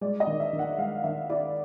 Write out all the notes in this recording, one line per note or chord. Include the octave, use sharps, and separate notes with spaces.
G#3 D5
D#5
D#3
E5
D#3
F#5
G#3 F5
D#3 E5
E4 D5